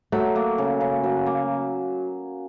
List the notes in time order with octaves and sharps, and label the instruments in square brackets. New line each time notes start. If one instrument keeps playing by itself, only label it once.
[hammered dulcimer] F#3 [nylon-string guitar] A3
[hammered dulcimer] A#3
C#3
C#3
F#3
A#3